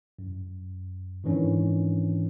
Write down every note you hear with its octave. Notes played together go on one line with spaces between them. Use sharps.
F#2
G#2 D#3 E3 C#4 D4